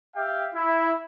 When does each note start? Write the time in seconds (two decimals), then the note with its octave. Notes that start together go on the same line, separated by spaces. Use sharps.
0.15 G4 E5 F5 G5
0.54 E4